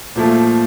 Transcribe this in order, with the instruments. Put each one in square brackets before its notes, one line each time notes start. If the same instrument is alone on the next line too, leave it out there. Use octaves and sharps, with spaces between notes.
[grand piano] A#2 F3 A3